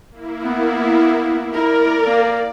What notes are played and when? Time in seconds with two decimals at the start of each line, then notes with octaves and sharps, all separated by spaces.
0.11 A#3 E4
0.44 B3
1.54 E4 A#4 D5
2.05 A#3